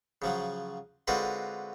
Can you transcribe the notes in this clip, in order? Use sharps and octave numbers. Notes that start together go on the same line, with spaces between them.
C#3 F3 F#3
D3 G#3 C4 F4 F#4 B4